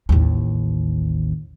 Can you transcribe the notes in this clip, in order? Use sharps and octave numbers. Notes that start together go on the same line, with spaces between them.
A1 D#2